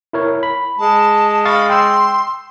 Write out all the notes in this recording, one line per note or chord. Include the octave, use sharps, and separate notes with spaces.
E4 A#4 C#5
B5
G#3 A5
F5 B5 C#6 A6
G5 C6 E6